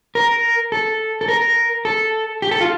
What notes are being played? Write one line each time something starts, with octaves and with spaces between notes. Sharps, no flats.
A#4
A4
A4
A#4
A4
G4
A4
F4